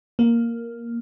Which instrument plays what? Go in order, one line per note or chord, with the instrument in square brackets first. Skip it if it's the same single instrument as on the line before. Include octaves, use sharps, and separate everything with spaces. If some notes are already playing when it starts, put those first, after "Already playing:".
[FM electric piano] A#3